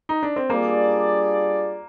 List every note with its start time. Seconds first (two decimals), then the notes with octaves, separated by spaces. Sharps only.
0.09 D#4
0.23 D4
0.36 C4
0.50 G3 A#3 D4 F4 G#4 D5